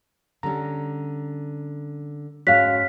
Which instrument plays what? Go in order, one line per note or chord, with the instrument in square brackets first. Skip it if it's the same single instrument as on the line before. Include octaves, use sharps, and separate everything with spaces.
[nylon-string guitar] D3 G3 C#4 [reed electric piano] A#5
[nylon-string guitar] G#2 G#3 C#4 [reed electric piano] F#4 C#5 [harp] F5 F#6 [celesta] B6